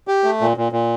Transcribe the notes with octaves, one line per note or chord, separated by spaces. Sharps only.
G4
A3
A#2
A#2
A#2